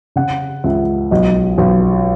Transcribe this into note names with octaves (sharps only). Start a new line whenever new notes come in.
C#3 F#5
C#2 E5
B1 D#5
B1